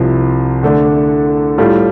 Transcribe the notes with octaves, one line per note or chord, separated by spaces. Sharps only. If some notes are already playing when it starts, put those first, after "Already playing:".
Already playing: C2 C3 F3
D3 A3 D4 A4
A2 G3 F4 A4